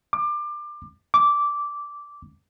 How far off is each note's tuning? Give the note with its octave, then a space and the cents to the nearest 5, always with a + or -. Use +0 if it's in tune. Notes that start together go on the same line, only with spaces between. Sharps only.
D6 +25
D6 -10